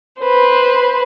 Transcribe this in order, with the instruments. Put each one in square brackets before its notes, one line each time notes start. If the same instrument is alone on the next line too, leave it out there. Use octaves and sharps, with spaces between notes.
[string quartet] B4 C5